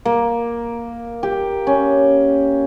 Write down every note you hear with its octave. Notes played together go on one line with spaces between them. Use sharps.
A#3
G4
C#4